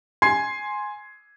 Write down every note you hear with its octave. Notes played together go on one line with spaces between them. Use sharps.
G#5 C6 G#6 C7